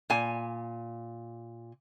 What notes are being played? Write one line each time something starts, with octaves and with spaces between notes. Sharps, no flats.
A#2 G#5